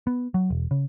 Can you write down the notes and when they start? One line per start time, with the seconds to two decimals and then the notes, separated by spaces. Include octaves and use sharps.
0.07 B3
0.34 F#3
0.50 E1
0.71 C#3